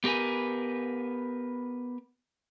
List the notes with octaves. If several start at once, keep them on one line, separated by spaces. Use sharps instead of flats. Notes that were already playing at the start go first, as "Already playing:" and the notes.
B3 G4 A#4 B4 G#5